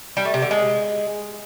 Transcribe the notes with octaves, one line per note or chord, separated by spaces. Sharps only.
G3
A3
C3
D3
G#3